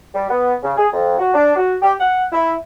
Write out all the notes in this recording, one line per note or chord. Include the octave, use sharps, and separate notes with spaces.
G3
B3
C#3
G#4
F2
F#4
D4
F#4
G4
F#5
E4